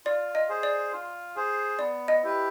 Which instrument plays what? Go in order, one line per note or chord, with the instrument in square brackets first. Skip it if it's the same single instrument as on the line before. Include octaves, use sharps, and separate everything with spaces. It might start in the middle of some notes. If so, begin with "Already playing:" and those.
[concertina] F4 [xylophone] D5
[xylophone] D#5
[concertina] G#4 C5
[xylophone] D5
[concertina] F4
G#4 C5
[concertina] B3 [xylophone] D5
[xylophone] D#5
[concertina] E4 G4 B4